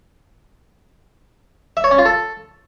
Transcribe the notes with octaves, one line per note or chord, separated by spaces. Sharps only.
E5
C#5
C#4
F4
A4